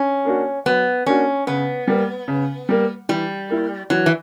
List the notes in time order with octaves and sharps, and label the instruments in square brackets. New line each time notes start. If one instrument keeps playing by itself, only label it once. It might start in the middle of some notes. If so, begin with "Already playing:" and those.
Already playing: [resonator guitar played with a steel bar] C#4
[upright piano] A#3 D4 F#4
[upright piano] F#3 [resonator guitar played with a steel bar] B3
[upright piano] A#3 D4 F#4 [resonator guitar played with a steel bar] C#4
[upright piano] C#3 [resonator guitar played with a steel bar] B3
[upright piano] G3 A#3
C#3
G3 A#3
[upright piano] E3 [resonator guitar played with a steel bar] G3
[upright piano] A#3 E4
[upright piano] E3 [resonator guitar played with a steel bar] F#3
[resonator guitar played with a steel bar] E3